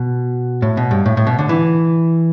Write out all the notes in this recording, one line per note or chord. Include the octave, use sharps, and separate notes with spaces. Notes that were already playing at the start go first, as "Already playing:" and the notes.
Already playing: B2
A2
B2
G2
A2
A2
B2
D3
E3